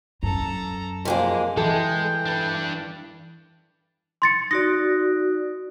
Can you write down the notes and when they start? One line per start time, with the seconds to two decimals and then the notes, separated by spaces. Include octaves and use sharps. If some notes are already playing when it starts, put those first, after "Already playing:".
0.23 F#2 A4 A#5
1.05 F2 G#3 A#3 F#4 G#4
1.57 E3 G#3 A4 G5
2.26 D4 B4
4.22 C6 A6 C#7
4.51 D#4 F#4 D5 A#6